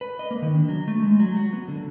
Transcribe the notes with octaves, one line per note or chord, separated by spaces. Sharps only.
B4
D#5
A#3
D#3
D4
F#3
A3
G#3
F#3
F#4
B3
D3